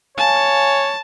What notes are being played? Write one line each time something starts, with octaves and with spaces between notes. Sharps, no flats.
C#5 F5 G#5 A5